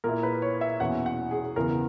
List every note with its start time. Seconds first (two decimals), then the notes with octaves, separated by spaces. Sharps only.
0.04 A#2 A#3 E4 A#4
0.23 B4
0.42 C#5
0.61 E5
0.80 E2 B2 A#3 C#4 E4 F#5
1.06 F#5
1.31 G#4
1.56 E2 C#3 E3 A#4